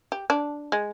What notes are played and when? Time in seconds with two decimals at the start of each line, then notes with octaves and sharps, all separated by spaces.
0.12 G4
0.30 D4
0.72 G#3